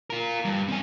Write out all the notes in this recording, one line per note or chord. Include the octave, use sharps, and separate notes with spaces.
F4 A#4
G2
C4 G#5